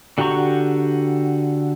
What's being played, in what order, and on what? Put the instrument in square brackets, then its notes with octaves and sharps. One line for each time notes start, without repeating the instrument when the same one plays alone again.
[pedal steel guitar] D3 F#4 G4 A#5 C#6